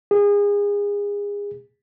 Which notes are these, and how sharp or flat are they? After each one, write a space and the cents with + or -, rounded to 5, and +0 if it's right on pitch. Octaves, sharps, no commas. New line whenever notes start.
G#4 -30